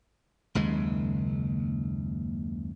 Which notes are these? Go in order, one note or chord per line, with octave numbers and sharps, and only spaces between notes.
F#1 D#2 C#3 G#3